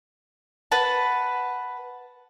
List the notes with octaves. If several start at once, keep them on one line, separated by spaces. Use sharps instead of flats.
B4 F#5 A5